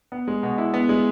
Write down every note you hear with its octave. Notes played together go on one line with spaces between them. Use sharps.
B3
G#3
B2
E4
B3
G#3